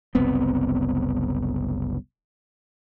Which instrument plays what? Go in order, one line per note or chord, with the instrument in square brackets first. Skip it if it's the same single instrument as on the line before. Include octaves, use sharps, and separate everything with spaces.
[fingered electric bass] F#1 C2 B3 C4